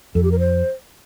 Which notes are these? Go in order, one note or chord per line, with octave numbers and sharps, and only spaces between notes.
F2 A4
G4
A#4
C5